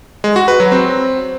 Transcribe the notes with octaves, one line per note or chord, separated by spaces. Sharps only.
G#3
F#4
B4
F#3
C4